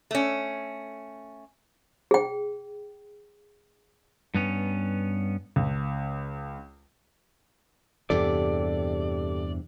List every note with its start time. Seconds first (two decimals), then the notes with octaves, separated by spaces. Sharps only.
0.11 A3 C#4
2.11 G#4 G5
4.34 G2 B3 C#4
5.56 C#2
8.10 E2 G2 C3 G4 A4 D5